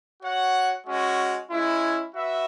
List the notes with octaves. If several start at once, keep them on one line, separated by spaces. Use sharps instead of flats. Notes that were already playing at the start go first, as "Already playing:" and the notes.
F#4 C#5 F#5
G#3 C#4 F#4
G#3 C#4 E4
F#4 B4 E5